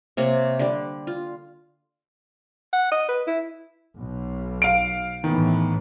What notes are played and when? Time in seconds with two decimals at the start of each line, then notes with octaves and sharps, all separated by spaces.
0.17 C3 A#3 C#5
0.59 D3 G3
1.07 F4
2.73 F#5
2.91 D#5
3.09 B4
3.27 E4
3.99 B1 B2
4.62 F5 D7
5.24 A2 D#3 E3 B3